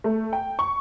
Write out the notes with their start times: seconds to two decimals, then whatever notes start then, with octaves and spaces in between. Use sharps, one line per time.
0.04 A3
0.33 G5
0.59 C#6